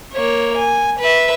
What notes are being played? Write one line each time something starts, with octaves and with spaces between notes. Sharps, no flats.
A#3 C#5
G#5
B4 E5